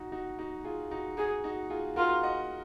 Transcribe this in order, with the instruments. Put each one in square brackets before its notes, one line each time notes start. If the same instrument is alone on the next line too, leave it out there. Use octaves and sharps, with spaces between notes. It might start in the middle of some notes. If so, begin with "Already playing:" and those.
Already playing: [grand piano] D#4 F#4
D#4 F#4
D#4 F#4
F4 G#4
D#4 F#4
[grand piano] D#4 F#4 [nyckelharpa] G#4
[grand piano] D#4 F#4
F4 G#4
[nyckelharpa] F4 [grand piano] F#4 A#4
[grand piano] D#5 F#5